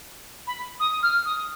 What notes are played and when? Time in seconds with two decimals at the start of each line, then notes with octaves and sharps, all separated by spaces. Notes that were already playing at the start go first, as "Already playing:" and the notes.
0.47 B5
0.80 D#6
1.03 F6
1.25 D#6